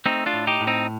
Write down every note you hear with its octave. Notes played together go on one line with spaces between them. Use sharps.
A3 C4 D#4
D4 F4
A2
D#4 G4
A2
C4 D#4